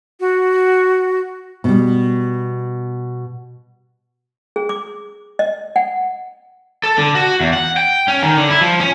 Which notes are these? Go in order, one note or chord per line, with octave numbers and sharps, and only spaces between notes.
F#4
B2 G3
G#4
D6
D#5
F#5
A4
D3
F#4
E2
F#5
G5
C#4
D#3
D3
E4
F3
C#4